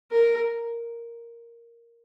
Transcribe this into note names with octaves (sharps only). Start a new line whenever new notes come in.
A#4